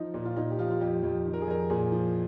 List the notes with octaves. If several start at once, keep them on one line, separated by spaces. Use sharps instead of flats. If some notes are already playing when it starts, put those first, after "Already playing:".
Already playing: F3 D#4
A#2
F4
A#2 D#4
G4
F3 F4
F4
F2 G4
F2
D#3
A#4
G#4
F2 A#4
A#2 G#4
F3